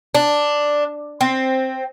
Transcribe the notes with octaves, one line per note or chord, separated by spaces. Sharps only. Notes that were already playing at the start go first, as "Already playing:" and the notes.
D4
C4